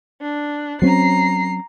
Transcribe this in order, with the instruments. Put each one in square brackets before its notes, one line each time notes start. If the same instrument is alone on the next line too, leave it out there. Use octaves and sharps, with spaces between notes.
[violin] D4
[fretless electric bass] F#3 C4 C#4 [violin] A#5 C7